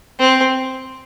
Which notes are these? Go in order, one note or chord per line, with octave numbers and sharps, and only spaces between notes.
C4